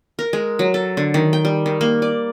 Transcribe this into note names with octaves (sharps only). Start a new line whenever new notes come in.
A#4
G#3
F#3
A4
D3
D#3
G5
G3
D#3
A#3
D5